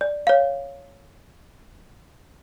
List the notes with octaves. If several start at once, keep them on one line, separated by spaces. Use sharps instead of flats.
D5
C#5 F5